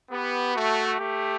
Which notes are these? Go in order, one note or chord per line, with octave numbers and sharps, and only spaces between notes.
B3 G4
A3 F#4
A3 G4